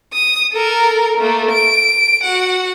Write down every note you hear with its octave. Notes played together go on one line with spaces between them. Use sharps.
D#6
A4 A#4
A3 A#3
D7
F#4 F#5